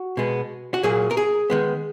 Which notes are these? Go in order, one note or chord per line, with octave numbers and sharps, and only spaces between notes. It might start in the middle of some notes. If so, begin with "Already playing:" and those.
Already playing: F#4
B2 G#3 B3
F#4
A#2 F#3 A#3 G#4
A#4
G#4
D#3 G#3 B3